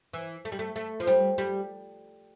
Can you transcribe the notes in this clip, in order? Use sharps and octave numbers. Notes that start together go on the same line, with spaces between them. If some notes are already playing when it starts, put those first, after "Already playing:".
E3
A3
G3
A3
A3
F3
G3
G3